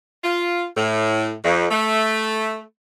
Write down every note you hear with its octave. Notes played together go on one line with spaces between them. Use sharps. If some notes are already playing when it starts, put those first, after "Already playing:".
F4
A2
F2
A3